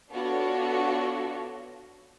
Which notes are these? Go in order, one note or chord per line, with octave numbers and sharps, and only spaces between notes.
B3 D4 F4 F#4 A4 C#5